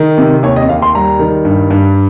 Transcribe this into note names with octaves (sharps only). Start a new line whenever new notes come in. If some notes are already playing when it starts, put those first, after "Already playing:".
Already playing: D#3
C3
D#2 C#5
D#5
D#2 F5
C6
G3 A#5
D#3
G2
G2